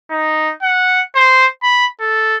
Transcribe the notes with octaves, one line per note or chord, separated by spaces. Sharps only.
D#4
F#5
C5
B5
A4